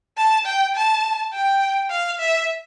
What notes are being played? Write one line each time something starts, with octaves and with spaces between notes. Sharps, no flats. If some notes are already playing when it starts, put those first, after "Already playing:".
A5
G5
A5
G5
F5
E5